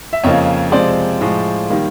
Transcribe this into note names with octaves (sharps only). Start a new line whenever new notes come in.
E5
F2 C#3 F3 A#3 C#5 D#5
C3 F3 G#3 C5 D5
A2 F3 G#3
D#3 G3 A#3